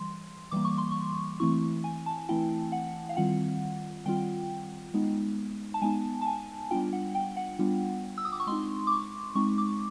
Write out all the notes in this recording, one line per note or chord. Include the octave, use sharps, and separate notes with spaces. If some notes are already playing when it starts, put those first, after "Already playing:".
Already playing: E3 G3 C6
E3 G3 A#3 D6
C#6
C6
C#6
E3 A3 C4 E4 C#6
G#5
A5
E3 A3 C4 E4 G5
F#5
F5
D#3 G3 C4 F4 F#5
D#3 G3 C4 F4 G5
G#3 B3 D#4
A5
G#3 B3 D#4 G#5
A5
G#5
G3 B3 D4 F4 G5
F#5
G5
F#5
G3 B3 D4 F4
E6
D#6
D6
C#6
G#3 C4 D#4 C6
D6
C#6
G#3 C4 D#4 C#6
D6